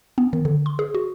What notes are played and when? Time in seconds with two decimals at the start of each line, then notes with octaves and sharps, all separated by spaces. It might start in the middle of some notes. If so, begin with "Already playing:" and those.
0.18 B3
0.33 D#3
0.45 D3
0.66 C6
0.79 G#4
0.95 F#4